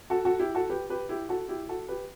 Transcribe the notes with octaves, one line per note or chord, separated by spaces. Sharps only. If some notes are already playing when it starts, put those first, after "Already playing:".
F#4 A4
F#4 A4
E4 G4
F#4 A4
G4 B4
G4 B4
E4 G4
F#4 A4
E4 G4
F#4 A4
G4 B4